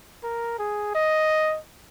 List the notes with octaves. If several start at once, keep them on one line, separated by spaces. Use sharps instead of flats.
A#4
G#4
D#5